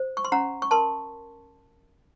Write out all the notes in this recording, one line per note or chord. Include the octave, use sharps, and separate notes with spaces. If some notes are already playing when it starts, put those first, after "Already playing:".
Already playing: C5
C#6
C6
C#4 F#5 A#5
C#6
A#4 A5 C6